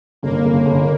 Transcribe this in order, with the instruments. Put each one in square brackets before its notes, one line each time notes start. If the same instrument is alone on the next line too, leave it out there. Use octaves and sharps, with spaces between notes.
[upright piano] G1 [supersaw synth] A#3
[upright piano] G1
G1